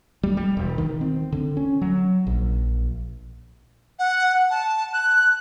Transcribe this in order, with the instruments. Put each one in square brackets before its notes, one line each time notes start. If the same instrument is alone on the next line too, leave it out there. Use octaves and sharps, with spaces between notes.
[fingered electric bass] G3
G3
E1
D#3
C4
D3
C#4
F#3
A#1
[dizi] F#5
A5
F#6